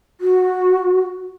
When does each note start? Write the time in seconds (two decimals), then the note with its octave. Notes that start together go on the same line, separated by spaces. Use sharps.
0.21 F#4